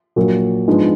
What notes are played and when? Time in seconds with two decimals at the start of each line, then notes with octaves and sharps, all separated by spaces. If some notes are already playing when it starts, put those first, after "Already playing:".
0.16 A#1 A#2 F#3 A#3
0.68 G#2 F3 G#3 B3 D4